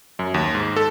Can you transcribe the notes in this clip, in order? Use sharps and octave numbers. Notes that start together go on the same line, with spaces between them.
F#2
D#2
G#2
A4